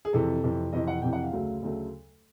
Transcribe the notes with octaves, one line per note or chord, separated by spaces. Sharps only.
G#4
F2 C3 E3 A4
F2 C3 E3
F2 C3 E3 D#5
F#5
F2 C3 E3 G5
F#5
F5
D2 C#3 F#3 A3
D2 C#3 F#3 A3